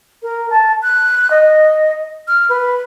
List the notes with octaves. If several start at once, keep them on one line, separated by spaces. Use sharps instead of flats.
A#4
A5
F#6
D#5
F6
B4